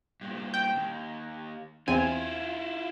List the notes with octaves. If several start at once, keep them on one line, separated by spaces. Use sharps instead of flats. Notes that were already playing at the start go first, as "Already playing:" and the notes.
G2 A#2
G5
D#2
E2 C4 E4 F4 G#5